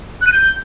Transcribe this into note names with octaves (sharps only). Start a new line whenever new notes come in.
F#6
D#7
G6